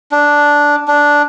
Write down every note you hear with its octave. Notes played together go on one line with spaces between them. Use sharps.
D4
D4